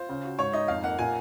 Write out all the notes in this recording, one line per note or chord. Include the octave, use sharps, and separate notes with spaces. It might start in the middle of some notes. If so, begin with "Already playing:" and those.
Already playing: F4 C5
C#3
F#4
G#2 C#5
D#4 D#5
F2 F5
A#3 F#5
A#2 G#5